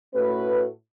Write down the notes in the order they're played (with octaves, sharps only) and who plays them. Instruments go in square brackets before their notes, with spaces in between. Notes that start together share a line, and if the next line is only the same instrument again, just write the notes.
[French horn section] A2 A3 C#4 F#4 B4